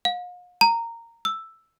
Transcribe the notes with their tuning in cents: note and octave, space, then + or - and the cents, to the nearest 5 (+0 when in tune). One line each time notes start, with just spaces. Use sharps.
F5 +45
A#5 -15
E6 +5